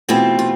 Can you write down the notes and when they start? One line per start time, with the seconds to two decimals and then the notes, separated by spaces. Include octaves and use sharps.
0.09 E2 B2 A3 C4 F4 G#4
0.39 F4